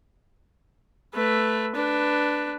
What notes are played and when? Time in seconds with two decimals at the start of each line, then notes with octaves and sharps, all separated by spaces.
1.14 A3 B4
1.76 D4 B4